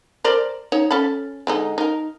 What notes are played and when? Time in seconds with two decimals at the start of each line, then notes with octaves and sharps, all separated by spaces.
0.24 A#4 C5 D5
0.72 D#4 C#5
0.91 C#4 A4 B5
1.47 D3 G#3 D#4
1.78 D#4 A#4